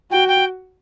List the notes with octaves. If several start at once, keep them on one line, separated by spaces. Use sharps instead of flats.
F#4 G5
G5